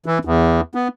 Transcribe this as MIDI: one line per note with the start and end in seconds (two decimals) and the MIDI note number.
0.06 0.18 52
0.25 0.61 40
0.75 0.88 59